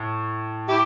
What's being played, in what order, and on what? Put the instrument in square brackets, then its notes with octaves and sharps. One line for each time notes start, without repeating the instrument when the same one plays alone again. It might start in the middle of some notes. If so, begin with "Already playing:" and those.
Already playing: [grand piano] A2
[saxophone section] E4 G4